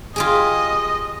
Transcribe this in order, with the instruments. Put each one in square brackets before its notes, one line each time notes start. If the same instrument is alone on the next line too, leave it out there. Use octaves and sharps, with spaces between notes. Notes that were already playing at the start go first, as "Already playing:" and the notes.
[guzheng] F4 G4 G#4 [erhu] D#5